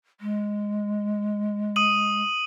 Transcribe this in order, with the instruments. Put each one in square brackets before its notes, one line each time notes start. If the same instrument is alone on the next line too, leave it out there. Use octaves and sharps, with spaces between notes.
[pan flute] G#3
[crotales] D#6 D#7 F#7